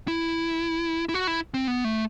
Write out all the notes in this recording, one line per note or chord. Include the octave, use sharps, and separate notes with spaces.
E4
E4
F#4
E4
C4
B3
A3